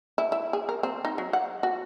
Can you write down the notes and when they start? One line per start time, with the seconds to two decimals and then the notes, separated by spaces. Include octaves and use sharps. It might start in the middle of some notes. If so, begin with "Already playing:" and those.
0.18 E4
0.32 E4
0.53 G#4
0.69 A#4
0.83 C4
1.05 D#4
1.18 F#3
1.33 F#5
1.63 F#4